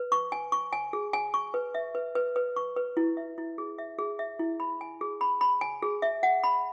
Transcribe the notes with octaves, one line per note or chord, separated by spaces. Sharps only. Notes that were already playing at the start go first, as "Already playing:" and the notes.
Already playing: B4
C#6
G#5
C#6
G#5
G#4
G#5
C#6
B4
E5
B4
B4
B4
C#6
B4
E4
E5
E4
G#4
E5
G#4
E5
E4
B5
G#5
G#4
B5
B5
G#5
G#4
E5
F#5
B5